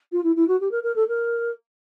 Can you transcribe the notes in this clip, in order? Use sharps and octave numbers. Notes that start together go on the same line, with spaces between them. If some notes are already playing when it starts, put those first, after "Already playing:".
F4
E4
E4
F#4
G4
A#4
A#4
A4
A#4